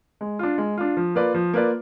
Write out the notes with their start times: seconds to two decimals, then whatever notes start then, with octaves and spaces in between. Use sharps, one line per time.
0.21 G#3
0.39 D4 F4
0.58 G#3
0.78 D4 F4
0.97 F3
1.15 A#3 F4 B4 D5
1.34 F3
1.53 A#3 F4 B4 D5